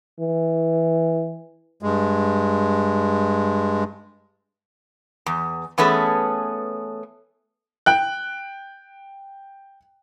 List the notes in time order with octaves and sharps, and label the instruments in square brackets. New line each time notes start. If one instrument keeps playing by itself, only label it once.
[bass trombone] E3
[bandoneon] G2 G#3
[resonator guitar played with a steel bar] E2
E3 A3 B3 C#4 G#4 A4
[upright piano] G5 F#6